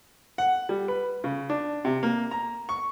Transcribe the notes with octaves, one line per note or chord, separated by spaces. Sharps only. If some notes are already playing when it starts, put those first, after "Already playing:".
F#5
G3
B4
C#3
D4
C3
A#3
A#5
C#6